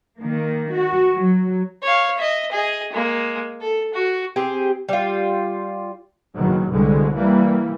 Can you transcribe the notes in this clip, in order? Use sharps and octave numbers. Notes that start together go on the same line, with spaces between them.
D#3 A#3
F#4
F#3
C#5 F5
D#5 E5
G#4 D#5
G#3 A#3
A4
F#4
C4 G4 G#4
G3 F4
F#1 B2 D#3 F#3
C2 B2 D3 G#3
E3 G3 A#3